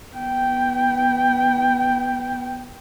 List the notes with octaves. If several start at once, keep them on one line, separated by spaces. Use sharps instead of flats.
B3 G5